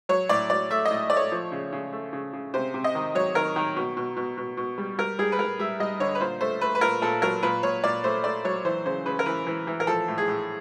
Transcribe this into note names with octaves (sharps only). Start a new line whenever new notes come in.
F#3 C#5
A2 D5
F#3 D5
A3 E5
D#5
A2
A3 D5
C#5
F3
C#3
C#3
A3
C#3
C#3
C3 C5
C3
D#5
D#3
F#3 C#5
D#3 A#4
D#3
B2
B2
B2
B2
B2
G3
G3 A#4
G3 G#4
B4
G3 A#4
G3 E5
G3 D#5
D3 C#5
B4
A#2 C5
A3 C5
A3 B4
B4
A#2 A#4
A#2 A4
F#3 A#4
A#2 B4
A#2 C#5
A#2 D5
A3 C5
A3 D5
F#3 C#5
E3 C5
C#3 C5
C#3 B4
A#4
E3 B4
E3
E3
A#4
F3 A4
A2
G#4
A2